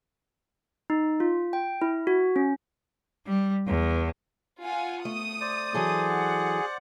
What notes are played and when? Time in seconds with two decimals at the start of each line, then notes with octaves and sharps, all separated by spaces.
0.90 D#4
1.20 F4
1.53 G5
1.82 E4
2.07 F#4
2.36 C#4
3.26 G3
3.66 E2
4.63 F4 F#5 G#5
5.05 A3 D#6
5.41 C5 D5
5.74 E3 F#3 G#4 A4
6.09 F#5